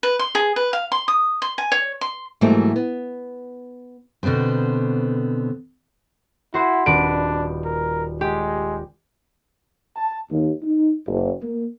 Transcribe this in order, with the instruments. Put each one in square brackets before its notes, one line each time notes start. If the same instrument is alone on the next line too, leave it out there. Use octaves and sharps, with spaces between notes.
[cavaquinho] B4
C6
G#4
B4
F5
C6
D#6
C6
G#5
C#5
C6
[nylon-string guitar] G#2 E3 F#3 G3 A3 A#3
B3
[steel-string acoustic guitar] B2 D3 B3 C4 C5
[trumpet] E4 [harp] F#4 C5
[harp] D#1 B4 D7 [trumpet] D4
[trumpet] A#4
[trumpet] G#3 [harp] G4
[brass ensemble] A5
D#2
D#4
F#1
A#3